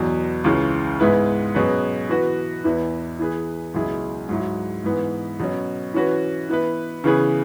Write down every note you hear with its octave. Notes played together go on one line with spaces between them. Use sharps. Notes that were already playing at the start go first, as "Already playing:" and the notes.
Already playing: E2 B2 F#3
C#2 C#3 E3
G#2 G#3 B3 E4 B4
B2 F#3 C#4 G#4 B4
E3 B3 F#4 B4
E2 E3 B3 E4
E3 B3 G#4 B4
C#2 B2 F#3 E4 G#4
G#2 F#3 E4
G#2 E3 B3
B2 F#3 C#4
E3 C#4 F#4 B4
E3 B3 E4 B4
C#3 E3 B3 G#4 B4